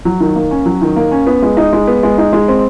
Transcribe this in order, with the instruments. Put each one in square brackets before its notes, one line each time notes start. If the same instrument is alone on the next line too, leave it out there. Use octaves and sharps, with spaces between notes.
[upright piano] F#3
D#3
A#3
C#4
F#3
D#3
A#3
C#4
B3
G#3
D#4
G#3
B3
G#3
D#4
G#3
C4